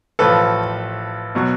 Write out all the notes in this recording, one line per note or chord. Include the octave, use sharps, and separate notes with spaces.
A1 A2 F3 A4 B4
B2 F#3